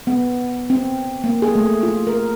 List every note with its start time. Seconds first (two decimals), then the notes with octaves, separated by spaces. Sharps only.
0.07 B3
0.70 C4
1.24 A#3
1.42 G#4
1.55 A3
1.83 F4
2.07 A#4